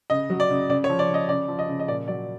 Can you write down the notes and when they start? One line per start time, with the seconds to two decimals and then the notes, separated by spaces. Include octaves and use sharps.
0.10 C#3 D#5
0.30 F#3
0.40 D5
0.50 C#3
0.70 C#3 D5
0.84 C#5
0.90 F3
0.99 D5
1.09 C#3
1.14 D#5
1.29 C#3 D5
1.48 F3
1.59 D#5
1.68 C#3
1.80 D#5
1.88 A#2 D5
2.08 F#3 D5